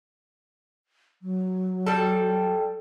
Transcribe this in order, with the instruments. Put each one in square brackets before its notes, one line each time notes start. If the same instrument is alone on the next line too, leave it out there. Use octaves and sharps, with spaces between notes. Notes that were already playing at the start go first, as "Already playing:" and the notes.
[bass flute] F#3
[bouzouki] G3 A4